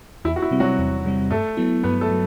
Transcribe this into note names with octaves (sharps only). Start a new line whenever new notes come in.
E2 E4
F#4
E4
C3 G3 C4
F#3 F#4
E2
C3 G3 C4
G2 A3 A4
F#3 B3 E4
G2 B3 B4
A3 A4
F#3